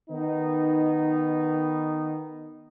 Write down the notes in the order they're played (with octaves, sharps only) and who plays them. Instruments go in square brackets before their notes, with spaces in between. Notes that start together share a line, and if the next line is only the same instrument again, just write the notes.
[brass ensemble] D#3 B3 D#4